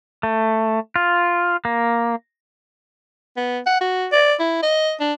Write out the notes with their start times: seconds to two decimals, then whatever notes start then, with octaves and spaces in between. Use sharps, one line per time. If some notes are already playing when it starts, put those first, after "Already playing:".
0.23 A3
0.96 F4
1.65 A#3
3.37 B3
3.66 F#5
3.81 F#4
4.12 D5
4.39 E4
4.63 D#5
5.00 D4